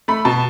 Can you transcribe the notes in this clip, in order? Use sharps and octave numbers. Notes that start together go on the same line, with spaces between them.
A3 B5
B2 A5